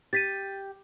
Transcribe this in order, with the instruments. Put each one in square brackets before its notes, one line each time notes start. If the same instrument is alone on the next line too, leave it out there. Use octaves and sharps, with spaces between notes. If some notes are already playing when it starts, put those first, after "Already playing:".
[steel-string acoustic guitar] G4 [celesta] A6 B6 D#7